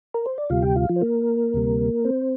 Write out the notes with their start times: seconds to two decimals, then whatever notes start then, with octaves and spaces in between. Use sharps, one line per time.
0.14 A#4
0.26 C5
0.38 D5
0.50 D2 C3 G3 F4 F5
0.62 G4 G5
0.76 F4 F5
0.89 F3 F4
0.96 C5
1.01 A#3 A#4
1.54 D2 C3 G3
2.05 C4 C5